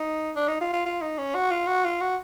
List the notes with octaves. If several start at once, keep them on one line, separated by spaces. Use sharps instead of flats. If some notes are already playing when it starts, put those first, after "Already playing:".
Already playing: D#4
D4
D#4
F4
F4
F4
D#4
C#4
F#4
F4
F#4
F4
F#4